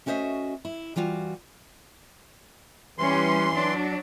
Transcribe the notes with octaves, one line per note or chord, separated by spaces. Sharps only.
A3 C#4 F#4 C5 D#5 E5
E4
E3 G3 F4 F#4
E3 G3 C#4 C6
F#3 D4